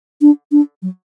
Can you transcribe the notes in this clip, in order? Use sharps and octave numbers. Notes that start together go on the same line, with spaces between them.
D4
D4
F#3